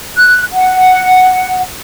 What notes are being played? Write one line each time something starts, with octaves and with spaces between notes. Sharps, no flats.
F#6
F#5